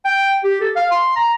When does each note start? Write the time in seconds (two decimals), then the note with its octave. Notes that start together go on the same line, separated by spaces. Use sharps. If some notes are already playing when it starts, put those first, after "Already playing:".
0.05 G5
0.44 G4
0.61 A4
0.76 F5
0.91 C6
1.16 A#5